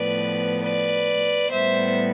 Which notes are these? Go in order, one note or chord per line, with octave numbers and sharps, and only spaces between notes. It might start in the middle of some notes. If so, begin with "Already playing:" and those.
Already playing: A2 F3 B3 B4 D5
B4 D5
A2 G3 B3 C5 E5